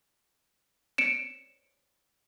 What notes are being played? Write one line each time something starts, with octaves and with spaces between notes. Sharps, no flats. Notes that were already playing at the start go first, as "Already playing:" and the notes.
C#7 D7 E7